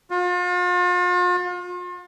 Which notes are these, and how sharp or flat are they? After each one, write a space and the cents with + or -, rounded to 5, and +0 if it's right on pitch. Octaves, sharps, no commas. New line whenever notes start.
F4 +40